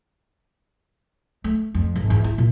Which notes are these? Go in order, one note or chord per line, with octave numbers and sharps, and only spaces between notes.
A3
F2
G#1
E2
E4
A#2